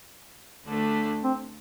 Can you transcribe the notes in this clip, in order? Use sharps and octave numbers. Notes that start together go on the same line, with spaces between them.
D2 D3 A3 D4
C4